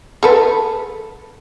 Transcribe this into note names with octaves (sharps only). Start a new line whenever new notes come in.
G#4 A4 B4